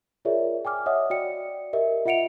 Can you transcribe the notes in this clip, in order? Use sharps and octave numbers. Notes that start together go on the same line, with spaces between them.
F4 G#4 A#4 C#5 D5 E5
G5 G#5 D6 F6
C#5 D#5 E5 F#5 D#6
F#4 D5 G5 C#7
G4 A#4 D#5 E5
F4 E5 F#5 C#7 D7 F7